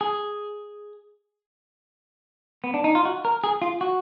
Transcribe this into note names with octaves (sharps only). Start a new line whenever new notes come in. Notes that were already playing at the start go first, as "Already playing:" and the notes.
G#4
B3
D4
D#4
F4
F#4
A#4
G#4
F4
F#4